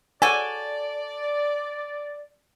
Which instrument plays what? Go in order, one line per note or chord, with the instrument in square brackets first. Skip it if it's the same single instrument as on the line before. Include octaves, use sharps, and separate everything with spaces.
[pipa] F#4 A4 [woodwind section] D5 [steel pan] G#5